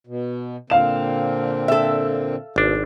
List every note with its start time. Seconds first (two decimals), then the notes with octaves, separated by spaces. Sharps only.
0.07 B2
0.70 A#2 D3 C4 F5 E7
1.68 A4 E5
2.56 G#1 B2 D4